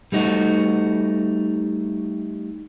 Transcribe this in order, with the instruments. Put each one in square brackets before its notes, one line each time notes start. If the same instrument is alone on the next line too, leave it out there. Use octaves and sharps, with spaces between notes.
[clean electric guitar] G3 A3 D#4 F#4